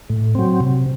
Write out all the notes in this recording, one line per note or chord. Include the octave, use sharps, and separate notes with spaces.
A2
F#3 C4
C3